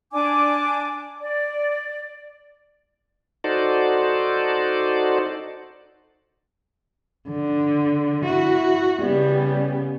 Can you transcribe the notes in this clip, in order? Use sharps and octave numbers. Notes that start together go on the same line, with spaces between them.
D4 G#5 D6
D5
D#4 F#4 A4 C5 D5
D3
E4 F#4
C#3 G3 B3